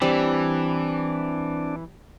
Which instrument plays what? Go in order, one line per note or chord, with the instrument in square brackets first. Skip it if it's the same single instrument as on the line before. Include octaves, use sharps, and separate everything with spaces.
[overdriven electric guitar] E3 [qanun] G3 D5 [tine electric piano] C4 [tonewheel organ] D4